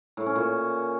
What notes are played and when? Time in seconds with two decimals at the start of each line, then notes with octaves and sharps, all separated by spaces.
0.17 A2
0.26 C#4
0.35 A#2